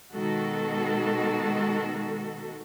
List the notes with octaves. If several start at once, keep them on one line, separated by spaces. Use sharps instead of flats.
B2 D#3 G#3 F#4 A4